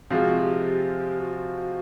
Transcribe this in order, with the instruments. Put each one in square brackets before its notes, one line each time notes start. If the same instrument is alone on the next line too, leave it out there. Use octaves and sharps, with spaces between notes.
[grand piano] C3 F3 G#3 C4 F4 [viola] F#4
[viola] G4
G4
G4
F#4